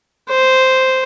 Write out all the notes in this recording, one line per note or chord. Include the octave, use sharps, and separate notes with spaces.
C5